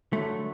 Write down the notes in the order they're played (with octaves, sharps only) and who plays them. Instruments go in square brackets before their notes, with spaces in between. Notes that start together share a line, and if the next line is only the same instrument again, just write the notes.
[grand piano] D3 F#3 [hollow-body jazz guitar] A3